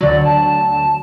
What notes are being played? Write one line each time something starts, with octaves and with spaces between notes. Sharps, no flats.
D2 D3 F#3 D5
A5